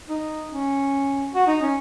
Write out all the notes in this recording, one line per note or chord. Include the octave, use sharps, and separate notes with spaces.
D#4
C#4
F#4
D#4
C#4